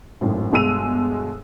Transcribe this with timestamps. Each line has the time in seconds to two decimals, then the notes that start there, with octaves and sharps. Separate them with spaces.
0.21 G#1 F#2 A2
0.52 G1 B2 G#3 E6 D#7 F7